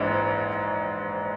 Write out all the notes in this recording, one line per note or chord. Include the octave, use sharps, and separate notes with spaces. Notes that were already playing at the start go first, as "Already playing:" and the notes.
Already playing: A#1 G#2 E3